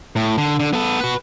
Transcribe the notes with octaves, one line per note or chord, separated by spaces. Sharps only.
A2
D3
D3
B3 A4
F#4 B4